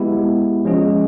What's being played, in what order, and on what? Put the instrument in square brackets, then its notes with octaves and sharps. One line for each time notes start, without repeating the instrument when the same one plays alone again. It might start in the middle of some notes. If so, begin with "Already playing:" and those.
Already playing: [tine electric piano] G#3 B3 E4 G4
F3 G#3 C#4 F4 G#4